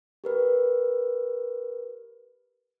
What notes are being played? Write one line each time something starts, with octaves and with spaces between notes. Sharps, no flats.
G4 A#4 B4